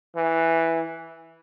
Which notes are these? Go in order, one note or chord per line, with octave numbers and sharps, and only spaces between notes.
E3